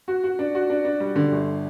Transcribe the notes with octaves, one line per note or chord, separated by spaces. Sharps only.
F#4
F#4
D4
F#4
D4
D4
G3
D3
G1